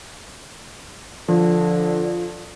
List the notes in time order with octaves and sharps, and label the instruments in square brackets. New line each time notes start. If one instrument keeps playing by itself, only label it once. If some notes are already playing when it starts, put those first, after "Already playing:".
[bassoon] D3 [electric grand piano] F3